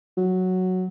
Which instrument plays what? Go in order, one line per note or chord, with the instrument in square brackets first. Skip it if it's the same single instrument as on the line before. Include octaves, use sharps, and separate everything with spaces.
[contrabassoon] F#3